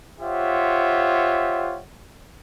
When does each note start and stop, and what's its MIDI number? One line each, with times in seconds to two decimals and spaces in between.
0.20 1.80 65
0.20 1.80 67
0.20 1.80 72
0.20 1.80 73
0.20 1.80 76
0.20 1.80 78